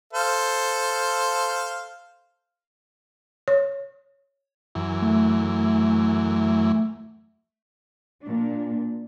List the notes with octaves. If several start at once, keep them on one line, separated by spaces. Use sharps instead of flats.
A4 C5 F5
C#5
F#2 E3
A3
A#2 D4